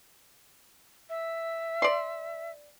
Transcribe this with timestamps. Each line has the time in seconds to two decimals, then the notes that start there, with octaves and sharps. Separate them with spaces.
1.10 E5
1.82 D5 C6